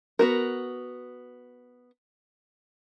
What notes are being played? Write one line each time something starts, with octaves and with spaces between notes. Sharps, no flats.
B3 F#4 A#4